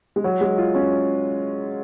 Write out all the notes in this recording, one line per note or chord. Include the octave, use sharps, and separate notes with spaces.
G#3
F#3
G#3
F4
C#4